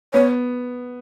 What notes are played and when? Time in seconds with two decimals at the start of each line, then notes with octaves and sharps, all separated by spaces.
0.13 B3 C#5